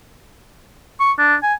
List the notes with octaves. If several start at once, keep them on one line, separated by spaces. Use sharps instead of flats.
C#6
D4
G#5